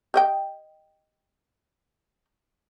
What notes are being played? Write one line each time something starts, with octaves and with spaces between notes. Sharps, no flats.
G4 D#5 G5